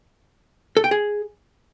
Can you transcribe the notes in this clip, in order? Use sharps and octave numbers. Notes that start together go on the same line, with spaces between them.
A4
G5
G#4